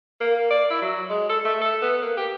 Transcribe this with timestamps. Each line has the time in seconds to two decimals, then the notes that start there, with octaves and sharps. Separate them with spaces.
0.21 A#3
0.51 D5
0.70 E4
0.82 F#3
1.10 G#3
1.29 A4
1.45 A3
1.62 A4
1.82 B3
2.02 A#3
2.17 G4